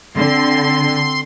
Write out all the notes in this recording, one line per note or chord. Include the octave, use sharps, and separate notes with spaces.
D3 C4 C6